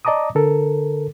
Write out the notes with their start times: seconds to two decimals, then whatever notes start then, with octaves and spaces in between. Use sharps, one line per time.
0.05 D5 D#5 A5 A#5 D6 D#6
0.35 D3 A4 A#4